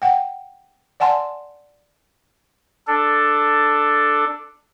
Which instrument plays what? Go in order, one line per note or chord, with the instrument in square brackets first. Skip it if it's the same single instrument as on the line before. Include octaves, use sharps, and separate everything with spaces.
[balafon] F#5 G5
D5 F#5 G#5 A5 C6
[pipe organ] D4 A4